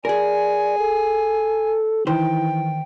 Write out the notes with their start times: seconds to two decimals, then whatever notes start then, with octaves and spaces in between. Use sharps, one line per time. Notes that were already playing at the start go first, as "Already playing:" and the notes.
0.05 G#4 A#4 D5 G#5
0.78 A4
2.07 D#3 E3 C5 G5